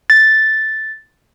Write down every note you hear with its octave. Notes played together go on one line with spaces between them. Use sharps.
A6